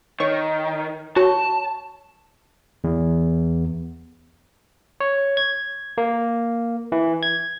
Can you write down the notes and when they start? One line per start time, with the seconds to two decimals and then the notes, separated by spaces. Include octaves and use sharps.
0.20 D#3 C#5 C#6
1.16 F#4 C#5 A5 C#6
2.84 E2
5.00 C#5
5.37 G#6
5.98 A#3
6.92 E3
7.23 G#6